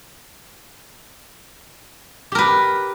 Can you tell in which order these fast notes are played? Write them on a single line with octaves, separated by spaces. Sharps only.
G4 A#4 B4